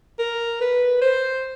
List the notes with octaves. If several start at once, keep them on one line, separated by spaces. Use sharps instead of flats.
A#4
B4
C5